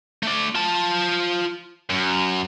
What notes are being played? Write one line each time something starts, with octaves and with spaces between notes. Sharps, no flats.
A3 D5
F4 A5
F#2